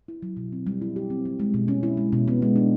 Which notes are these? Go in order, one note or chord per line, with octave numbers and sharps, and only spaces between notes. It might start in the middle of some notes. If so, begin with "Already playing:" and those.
E4
F#3
B2
C4
G3
E4
G4
C4
G3
G#3
B2
C#4
E4
G#3
B2
B3
G#3
D4